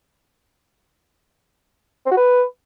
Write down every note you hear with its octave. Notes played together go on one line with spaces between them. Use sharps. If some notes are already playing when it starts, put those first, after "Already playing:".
C4
F#4
B4